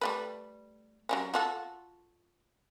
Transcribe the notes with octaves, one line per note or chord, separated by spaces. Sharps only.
G3 A3 B4
F#3 G3 C#4
F4 F#4 A4